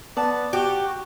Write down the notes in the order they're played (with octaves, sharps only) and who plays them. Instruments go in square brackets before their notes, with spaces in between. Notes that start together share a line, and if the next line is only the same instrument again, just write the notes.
[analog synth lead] B3 [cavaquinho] D5 A5
[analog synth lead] F#4 [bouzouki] G4